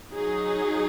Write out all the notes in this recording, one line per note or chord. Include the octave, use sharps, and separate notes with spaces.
F#3 D#4 G#4